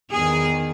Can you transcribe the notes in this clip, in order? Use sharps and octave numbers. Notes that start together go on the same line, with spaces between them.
E2 D#3 G#4